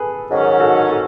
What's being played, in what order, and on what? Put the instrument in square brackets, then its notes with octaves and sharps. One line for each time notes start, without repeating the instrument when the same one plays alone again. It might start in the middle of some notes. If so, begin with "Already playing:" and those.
Already playing: [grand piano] G#4 A4 B4
[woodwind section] G#2 D#3 F#3 C#4
[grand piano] F#4 A4
F#4 A4